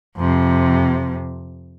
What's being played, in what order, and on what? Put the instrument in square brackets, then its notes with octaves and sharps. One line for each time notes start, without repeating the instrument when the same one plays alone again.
[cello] F2 C3